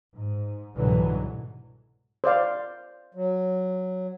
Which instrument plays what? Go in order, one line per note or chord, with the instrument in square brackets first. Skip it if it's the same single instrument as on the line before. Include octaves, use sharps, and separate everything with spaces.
[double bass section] G#2
C2 G#2 B2 D3 E3 F#3
[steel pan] C5 D5 F5
[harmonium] F#3